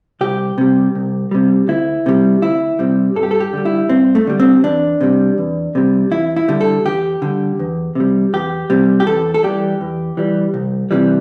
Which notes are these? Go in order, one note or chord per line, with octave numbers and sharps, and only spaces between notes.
C2 G4
C3 G3
C2
C3 G3
D2 E4
C3 G3
D2 E4
C3 G3
G2 A4
G4
A4
G4
D3 G3
E4
G2 C4
A3
D3 G3
C4
E2 D4
C3 G3
E2
C3 G3
E2 E4
E4
D3 G3
A4
E2 G4
D3 G3
E2
C3 G3
E2 G4
C3 G3
G4
E2 A4
A4
E3 G3 G4
E2
E3 G3
C2
C3 E3 G3